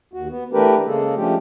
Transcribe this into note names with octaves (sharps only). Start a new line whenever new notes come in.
D#2 F#4
B3
E3 A3 D4 G4 A#4 B4
C#3 G#3 A#3 G#4 A4
F3 G#3 A3 C#4 D4 G4